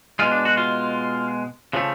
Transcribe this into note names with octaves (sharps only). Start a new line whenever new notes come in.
B2 G#3 F4
D4
F#4
F4
C#3 F3 A3